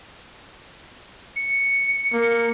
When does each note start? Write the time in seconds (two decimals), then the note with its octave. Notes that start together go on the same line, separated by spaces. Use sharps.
1.36 C#7
2.13 A#3